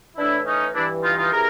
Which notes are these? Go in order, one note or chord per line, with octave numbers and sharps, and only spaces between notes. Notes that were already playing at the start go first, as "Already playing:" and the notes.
A2 E3 D4 E4
C#4 D#4
G2 E3 D4 E4
D#4 F4
D#4 F4
C3 E3 G#4 A#4